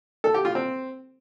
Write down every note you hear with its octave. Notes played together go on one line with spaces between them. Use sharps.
A4
G4
F4
C4